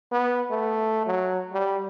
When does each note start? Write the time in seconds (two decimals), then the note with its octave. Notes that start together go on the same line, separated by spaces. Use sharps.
0.12 B3
0.50 A3
1.06 F#3
1.53 G3